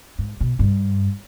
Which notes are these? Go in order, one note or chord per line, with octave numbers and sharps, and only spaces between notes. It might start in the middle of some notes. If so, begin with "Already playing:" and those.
G#2
B2
G2